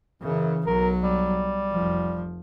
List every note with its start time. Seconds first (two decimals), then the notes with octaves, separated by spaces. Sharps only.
0.22 F#2 C#3 E3
0.67 B1 F#3 A#4
1.03 G3
1.72 F1 F3